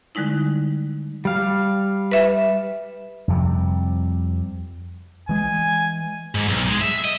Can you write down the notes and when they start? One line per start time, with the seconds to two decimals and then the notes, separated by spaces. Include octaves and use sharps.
0.15 D3 G3 G#3 D#4 E4
1.25 G3 F5
2.11 B4 E5
3.28 F2 C3 G3
5.29 E3 G#3 G#5
6.35 G#2
6.48 B1
6.68 G#3
6.81 E5
7.05 D#5